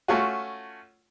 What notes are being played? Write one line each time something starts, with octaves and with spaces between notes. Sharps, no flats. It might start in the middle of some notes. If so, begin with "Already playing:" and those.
A3 C#4 F4 F#4